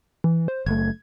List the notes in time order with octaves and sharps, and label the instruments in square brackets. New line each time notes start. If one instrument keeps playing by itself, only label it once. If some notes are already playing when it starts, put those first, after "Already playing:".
[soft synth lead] E3
C5
[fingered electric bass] F#1 A3 [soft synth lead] G#6